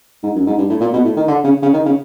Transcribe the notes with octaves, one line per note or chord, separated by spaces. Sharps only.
G#2
F#2
G#2
G2
A2
A#2
B2
A2
D#3
D3
C#3
C#3
D#3
C#3